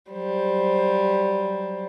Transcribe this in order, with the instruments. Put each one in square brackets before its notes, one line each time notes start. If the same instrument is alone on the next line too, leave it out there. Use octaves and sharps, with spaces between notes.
[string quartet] F#3 G3 C5